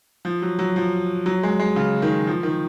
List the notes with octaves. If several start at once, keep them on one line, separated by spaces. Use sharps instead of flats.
F3
F#3
F#3
F3
F#3
G#3
G#3
C#3
D#3
F3
D#3